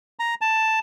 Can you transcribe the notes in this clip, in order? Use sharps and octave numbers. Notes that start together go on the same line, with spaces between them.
A#5
A5